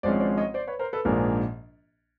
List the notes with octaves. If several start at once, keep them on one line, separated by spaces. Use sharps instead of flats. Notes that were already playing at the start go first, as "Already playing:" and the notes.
G#1 G#2 F3 G#3 C#4 C5 D5
C5 D5
C#5 D#5
C5 D5
B4 C#5
A#4 C5
A4 B4
A#1 G#2 F3 A#3 D4 G#4 A#4